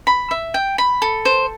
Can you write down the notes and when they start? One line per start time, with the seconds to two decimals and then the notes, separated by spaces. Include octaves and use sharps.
0.07 B5
0.31 E5
0.54 G5
0.78 B5
1.02 A4
1.25 C5